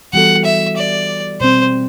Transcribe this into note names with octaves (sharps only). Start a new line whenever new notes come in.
E3 G3 B3 F#4 A4 F#5
E5
D5
B2 G3 C4 C5